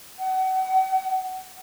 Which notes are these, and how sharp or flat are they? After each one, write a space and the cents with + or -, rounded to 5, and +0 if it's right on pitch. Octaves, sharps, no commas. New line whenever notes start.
F#5 +35